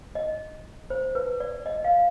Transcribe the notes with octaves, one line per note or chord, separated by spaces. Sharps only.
D#5
C5
B4
D5
D#5
F5